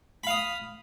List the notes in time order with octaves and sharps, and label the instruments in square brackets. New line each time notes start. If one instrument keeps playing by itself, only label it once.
[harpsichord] B5
F5
D#6